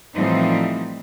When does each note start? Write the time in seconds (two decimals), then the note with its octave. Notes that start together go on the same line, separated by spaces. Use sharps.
0.14 A2 E3 F3 G3 C4 D#4